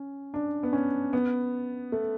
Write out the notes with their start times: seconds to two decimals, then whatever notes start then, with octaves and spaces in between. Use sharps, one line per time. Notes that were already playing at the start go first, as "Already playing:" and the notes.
Already playing: C#4
0.34 D4
0.63 B3
0.73 C#4
1.13 B3
1.92 A3